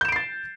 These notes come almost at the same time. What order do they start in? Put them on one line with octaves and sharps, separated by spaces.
G6 E7 D7 C7 A6